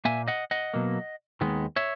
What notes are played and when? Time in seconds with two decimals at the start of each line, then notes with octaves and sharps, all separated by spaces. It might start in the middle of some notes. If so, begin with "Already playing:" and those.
0.05 A#2 A#3 E5 G#5
0.28 D#5 F#5
0.51 D#5 F#5
0.74 B2 F#3 A#3
1.41 D#2 D#3 G#3 B3
1.76 C#5 E5